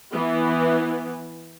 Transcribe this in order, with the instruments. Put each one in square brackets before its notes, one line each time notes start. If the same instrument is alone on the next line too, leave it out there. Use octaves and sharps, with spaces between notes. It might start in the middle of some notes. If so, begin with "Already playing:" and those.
[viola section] E3 B3